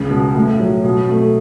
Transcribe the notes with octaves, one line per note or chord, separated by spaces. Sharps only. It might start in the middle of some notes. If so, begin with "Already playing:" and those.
Already playing: C#2 C#3
B2
A2
F#3
B2
A3